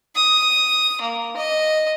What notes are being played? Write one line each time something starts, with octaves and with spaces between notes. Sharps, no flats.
D#6
A#3
D#5